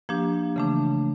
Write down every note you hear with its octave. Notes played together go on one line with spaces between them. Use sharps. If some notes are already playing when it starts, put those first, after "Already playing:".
F3 A#3 D4 G4
C#3 E3 A3 D4